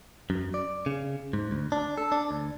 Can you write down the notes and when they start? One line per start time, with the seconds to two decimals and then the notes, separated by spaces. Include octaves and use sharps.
0.30 F#2
0.54 D5
0.86 C#3
1.33 G#2
1.51 D2
1.72 D4
1.98 A4
2.12 D4
2.31 D2